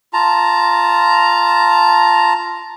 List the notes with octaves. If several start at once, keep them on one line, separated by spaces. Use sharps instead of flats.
F4 A5 A#5